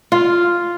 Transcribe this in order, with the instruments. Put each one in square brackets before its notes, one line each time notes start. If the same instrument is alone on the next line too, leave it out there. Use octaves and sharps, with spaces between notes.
[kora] F4